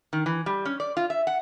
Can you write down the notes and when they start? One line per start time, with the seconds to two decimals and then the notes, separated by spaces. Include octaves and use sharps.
0.13 D#3
0.26 E3
0.46 G3
0.65 C#4
0.80 D5
0.97 F4
1.10 E5
1.27 F#5